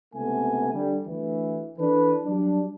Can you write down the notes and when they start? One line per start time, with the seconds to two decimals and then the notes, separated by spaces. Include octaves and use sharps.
0.14 C#2 C3 A3 B3 G#5
0.72 D3 G3
1.06 D2 E3
1.79 E3 D4 A4 B4
2.25 F#3 G3 D4